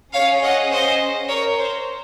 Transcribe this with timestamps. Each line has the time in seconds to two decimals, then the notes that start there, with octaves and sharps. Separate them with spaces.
0.13 C#4 G#4 C#5 F5
0.43 D#5 F#5
0.71 C5 D#5
1.29 A#4 C#5
1.58 C5